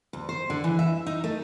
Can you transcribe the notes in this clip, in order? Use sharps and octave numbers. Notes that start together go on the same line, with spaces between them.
D2
C5
D3
E3
E5
D#4
A3